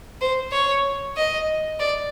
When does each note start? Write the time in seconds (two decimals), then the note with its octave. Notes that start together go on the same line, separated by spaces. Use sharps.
0.21 C5
0.52 C#5
1.17 D#5
1.80 D5